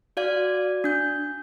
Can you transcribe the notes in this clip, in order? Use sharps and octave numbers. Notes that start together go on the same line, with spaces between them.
F#4 D5 F5 G#6
D4 G6